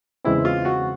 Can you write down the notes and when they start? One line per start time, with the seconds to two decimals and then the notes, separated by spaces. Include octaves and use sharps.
0.25 E2 C#3 E3 G#3 C4 E4
0.45 F4
0.65 F#4